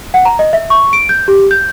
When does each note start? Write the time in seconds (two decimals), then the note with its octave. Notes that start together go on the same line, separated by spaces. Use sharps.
0.14 F#5
0.25 A#5
0.39 D#5
0.53 E5
0.70 C#6
0.93 D7
1.09 G6
1.28 G4
1.51 G6